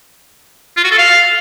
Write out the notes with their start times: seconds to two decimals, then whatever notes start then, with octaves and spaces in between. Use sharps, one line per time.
0.77 F4
0.84 F#4
0.91 A4
0.98 F5